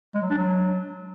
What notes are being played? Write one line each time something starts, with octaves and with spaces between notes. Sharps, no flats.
G#3
F#3
D4
F#3